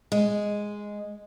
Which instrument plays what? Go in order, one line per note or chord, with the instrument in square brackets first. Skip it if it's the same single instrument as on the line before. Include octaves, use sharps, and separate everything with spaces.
[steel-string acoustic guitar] G#3